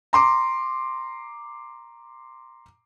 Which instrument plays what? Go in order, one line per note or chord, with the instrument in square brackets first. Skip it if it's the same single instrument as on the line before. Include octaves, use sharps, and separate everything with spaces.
[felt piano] A#5 C6 D6